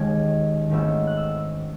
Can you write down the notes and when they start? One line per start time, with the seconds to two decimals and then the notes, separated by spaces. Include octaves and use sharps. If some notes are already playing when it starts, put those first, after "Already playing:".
Already playing: D#2 D#3 G#3 C#4 G#6
0.69 G#1 G#2 D#3 A3 C#4 E6
1.07 F#6
1.17 E6